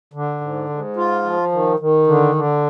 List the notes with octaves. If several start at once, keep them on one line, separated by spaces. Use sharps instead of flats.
D3
G#2
G#2
F4
F3
D#3
D#3
D3
D3